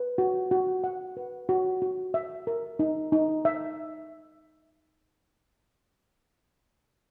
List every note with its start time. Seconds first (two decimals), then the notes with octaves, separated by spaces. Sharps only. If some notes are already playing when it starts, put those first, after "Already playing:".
Already playing: B4
0.18 F#4
0.51 F#4
0.84 F#5
1.17 B4
1.49 F#4
1.82 F#4
2.14 E5
2.47 A#4
2.79 D#4
3.12 D#4
3.45 E5